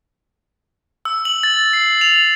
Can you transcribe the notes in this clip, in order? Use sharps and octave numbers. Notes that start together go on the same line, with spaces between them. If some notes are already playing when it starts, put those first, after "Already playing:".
E6
F#7
A6
C7
F7